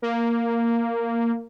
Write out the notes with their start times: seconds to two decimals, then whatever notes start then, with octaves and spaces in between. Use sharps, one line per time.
0.02 A#3